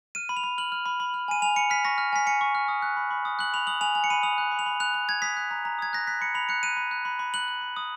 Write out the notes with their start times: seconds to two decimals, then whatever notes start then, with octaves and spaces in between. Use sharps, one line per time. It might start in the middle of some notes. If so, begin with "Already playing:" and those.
0.15 F6 D#7
0.29 B5
0.37 F7
0.44 B5
0.58 F6 F#7
0.72 F6
0.86 B5
1.00 B5
1.14 F6
1.28 G#5 D#7
1.42 G#5 F7
1.56 B5 C#7
1.70 F6 B6
1.85 C#6 A#6
1.98 F6
2.13 G#5 B6
2.26 G#5 C#7
2.41 C#6
2.55 F6
2.68 D#6
2.82 F#6
2.97 B5
3.11 B5
3.25 D#6
3.39 F#6 F#7
3.54 B5 F7
3.67 D#6 F#7
3.81 G#5 F7
3.95 G#5 F7
4.04 C#7
4.10 B5 D#7
4.23 D#6 F7
4.38 F#6
4.51 B5
4.59 F7
4.66 B5
4.80 F#6 F7
4.94 F#6
5.09 B5 G#6
5.22 D#6 B6
5.37 F#6
5.51 A#5
5.65 A#5
5.79 D#6 G#6
5.93 F#6 A#6
6.07 F#6 B6
6.21 B5 C#7
6.35 B5 F7
6.49 F#6 C#7
6.63 F#6 D#7
6.77 B5
6.91 F#6
7.05 B5
7.19 B5
7.34 F#6 F#7
7.48 F#6
7.61 B5
7.77 D#6